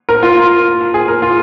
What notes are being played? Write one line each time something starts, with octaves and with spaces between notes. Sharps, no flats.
A#4
F4
F4
G#4
A#4
F4